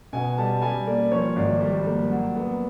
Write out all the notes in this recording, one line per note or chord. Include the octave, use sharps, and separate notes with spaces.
B2 G#5
G3 A5
G3 G#5
A#3 D5
F3 C#5
G#1 D5
G3
A#3
F#3
B3